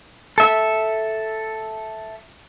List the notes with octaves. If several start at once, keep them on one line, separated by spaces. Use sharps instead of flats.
A4 E5